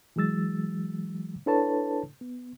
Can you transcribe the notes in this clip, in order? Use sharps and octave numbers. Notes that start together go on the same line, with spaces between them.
E3 F#3 G#3 E6 A6
D4 E4 A4 B4 C#5 A5
B3